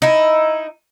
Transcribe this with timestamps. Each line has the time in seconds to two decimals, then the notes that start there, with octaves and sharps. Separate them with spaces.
0.02 D#4 E4